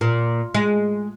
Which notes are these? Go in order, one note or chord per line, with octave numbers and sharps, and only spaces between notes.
A#2
G#3